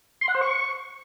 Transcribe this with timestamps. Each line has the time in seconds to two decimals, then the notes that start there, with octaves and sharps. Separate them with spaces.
0.21 C6
0.28 F#5
0.35 C5
0.41 C#6